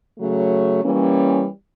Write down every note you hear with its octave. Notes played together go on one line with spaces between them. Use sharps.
C#3 F#3 A3
E3 G3 A#3 C#4